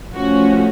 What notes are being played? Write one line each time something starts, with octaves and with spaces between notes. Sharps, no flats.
F3 A3 C#4 F#4